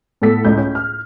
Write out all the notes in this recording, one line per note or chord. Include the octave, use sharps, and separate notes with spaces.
A2 B3 A4 B6
C#2 A2 G6
C#4
F6